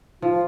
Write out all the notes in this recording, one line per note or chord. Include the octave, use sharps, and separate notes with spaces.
F3 F4